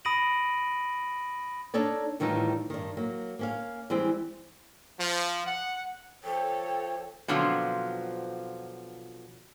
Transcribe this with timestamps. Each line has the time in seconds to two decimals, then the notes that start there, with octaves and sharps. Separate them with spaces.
0.05 B5 D#6 A#6 D7 D#7 F#7
1.74 A#3 D4 D#4 A4 C#5 D5
2.20 A2 D#3 E3 G3 D#4 F4
2.70 G2 D#3
2.97 F#3 A#3
3.39 A#3 C#4 F5
3.90 E3 G3 G#3 C4
4.99 F3
5.46 F#5
6.24 F3 A4 C#5 G5
7.28 B2 D3 F3 F#3 C4 F4